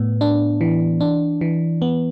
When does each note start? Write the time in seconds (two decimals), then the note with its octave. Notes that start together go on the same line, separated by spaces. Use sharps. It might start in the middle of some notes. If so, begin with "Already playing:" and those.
Already playing: A2 B3
0.21 D4
0.61 E3
1.01 D4
1.41 E3
1.82 B3